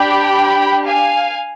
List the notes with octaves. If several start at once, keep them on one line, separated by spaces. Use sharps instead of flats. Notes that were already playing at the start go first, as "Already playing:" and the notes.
Already playing: D4 G4 G5 B5
F5 G#5